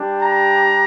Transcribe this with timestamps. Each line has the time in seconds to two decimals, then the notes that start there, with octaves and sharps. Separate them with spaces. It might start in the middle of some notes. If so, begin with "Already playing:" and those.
Already playing: G3 D4 G4
0.22 A#5